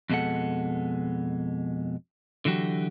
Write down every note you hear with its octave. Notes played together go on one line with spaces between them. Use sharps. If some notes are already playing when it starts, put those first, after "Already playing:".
F2 B2 G#3 A4 F#5
D3 E3 F#3 F#4 G4